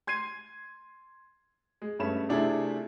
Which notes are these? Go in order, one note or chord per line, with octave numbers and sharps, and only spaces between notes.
C6 G#6 C7 D#7
G#3
G2 A3 C#4 B5 E7
C3 A3 D4 E4 F4 G#4